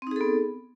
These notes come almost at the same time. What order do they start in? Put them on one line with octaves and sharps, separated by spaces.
C4 D#4 G#4 A4 B3